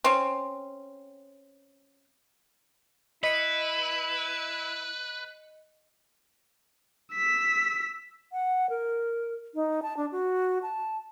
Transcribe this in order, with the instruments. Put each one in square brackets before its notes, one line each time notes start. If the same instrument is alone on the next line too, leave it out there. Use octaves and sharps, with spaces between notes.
[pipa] C4 C#4
[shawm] E4 [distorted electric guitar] B4 [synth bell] D#5 C#7 [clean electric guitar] B5
[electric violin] E6 B6
[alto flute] F#5
A#4
D#4
A5
D4
F#4
A5